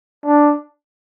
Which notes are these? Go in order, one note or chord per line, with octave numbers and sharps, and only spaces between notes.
D4